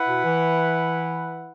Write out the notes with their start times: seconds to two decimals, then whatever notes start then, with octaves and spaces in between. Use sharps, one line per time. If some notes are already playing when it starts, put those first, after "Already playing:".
Already playing: E4 B4 F#5
0.08 B2
0.25 E3